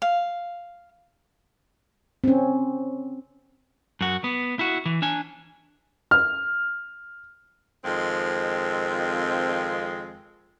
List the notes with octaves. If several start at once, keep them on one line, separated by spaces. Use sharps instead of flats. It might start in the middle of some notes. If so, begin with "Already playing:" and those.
F5
C4 C#4
F#2 F#4
B3
E4 F#4
E3
D4 G#5
F6
F2 D#3 F3 G#3 C4